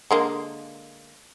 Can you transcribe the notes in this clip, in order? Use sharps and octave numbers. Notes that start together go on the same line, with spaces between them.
D3 G#3 A#3